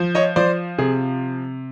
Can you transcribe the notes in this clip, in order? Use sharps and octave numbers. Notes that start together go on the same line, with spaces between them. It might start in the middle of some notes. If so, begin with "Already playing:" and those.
Already playing: F3
C#5 D#5
F3 C5 D5
C3 G#4